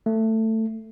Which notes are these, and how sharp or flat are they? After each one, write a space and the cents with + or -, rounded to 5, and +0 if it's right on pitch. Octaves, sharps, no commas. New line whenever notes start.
A3 +15